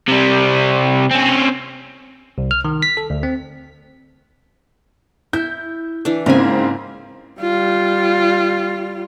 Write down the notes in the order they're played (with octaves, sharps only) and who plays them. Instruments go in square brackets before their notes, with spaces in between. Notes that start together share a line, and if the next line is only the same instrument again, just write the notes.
[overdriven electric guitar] C3 G3
C4 C#4
[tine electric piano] C2
F6
D#3
B6
A4
D2
C4
[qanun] E4 [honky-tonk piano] G6
[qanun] E3 D4
[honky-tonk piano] G#2 C#3 C4 [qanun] A#3 G#5
[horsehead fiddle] G3 F4